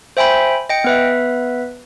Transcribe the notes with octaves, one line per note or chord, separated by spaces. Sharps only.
C5 E5 G5 G#5 B5
D#5 G5 C#7
B3 B4 E5